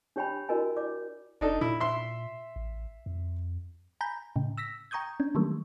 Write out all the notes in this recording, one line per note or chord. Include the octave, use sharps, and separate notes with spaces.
D4 G4 C#5 G5 G#5 B5
E4 F#4 A#4 D5 D#5 G#5
C#5 D5 D6
F1 D4 D#4 A4
A#2 E4
E5 C6
A1
F2
G#5 A#5 B5 G6
A2 C#3
E6 A#6 B6
G5 A#5 C#6 D#6 G6 G#6
C#4 D4
D#3 E3 F#3 G3 A3 A#3